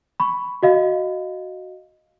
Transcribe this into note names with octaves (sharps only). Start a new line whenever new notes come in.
B5 C#6
F#4 D#5 F5